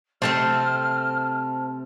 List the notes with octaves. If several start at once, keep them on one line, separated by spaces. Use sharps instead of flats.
C3 A3 C4 A4 C5 F6